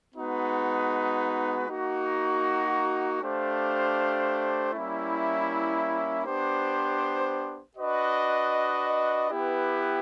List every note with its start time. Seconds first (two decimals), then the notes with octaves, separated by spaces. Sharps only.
0.15 G#3 B3 D#4 F#4 B4
1.67 A#3 D#4 F#4
3.20 A3 D4 G4 C5 F5
4.72 G3 A#3 C#4 E4
6.25 B3 D4 G4 C5
7.77 D4 F#4 B4 D#5
9.29 B3 E4 G4 B4